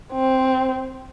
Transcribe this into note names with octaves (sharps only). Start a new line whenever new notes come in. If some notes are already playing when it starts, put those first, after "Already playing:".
C4